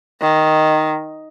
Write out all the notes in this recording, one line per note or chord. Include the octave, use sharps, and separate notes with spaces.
D#3